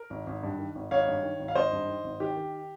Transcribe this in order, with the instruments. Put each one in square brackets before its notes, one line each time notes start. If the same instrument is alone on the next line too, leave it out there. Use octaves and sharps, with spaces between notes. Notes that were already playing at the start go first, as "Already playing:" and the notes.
Already playing: [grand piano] A#4
G#1
G#1
G2
D#3
G#1
G#1 C#5 F5
G2
D#3
G#1
F5
G#1 C5 D#5
G2
D#3
G#1
D#3 G4
D#3